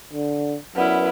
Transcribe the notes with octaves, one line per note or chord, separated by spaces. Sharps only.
D3
F#2 B3 E4 B4 D5 F6